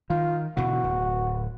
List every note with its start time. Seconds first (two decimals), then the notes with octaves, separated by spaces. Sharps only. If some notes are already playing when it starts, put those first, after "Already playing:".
0.10 D#3 F4
0.57 B2 D3 E3 F#4
0.84 D1